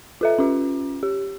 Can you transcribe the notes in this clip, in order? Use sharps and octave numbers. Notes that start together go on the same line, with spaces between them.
F4 A4 E5
C#4 F4
G4